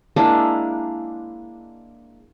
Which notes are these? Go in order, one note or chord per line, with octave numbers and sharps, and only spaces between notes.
G#3 A#3 D4 E4